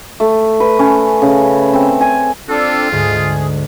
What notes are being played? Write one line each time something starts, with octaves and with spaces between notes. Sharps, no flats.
A3
B4
C#4
C#3
C4
G#5
C4 D4 F4 A4
D2 G#2 G#4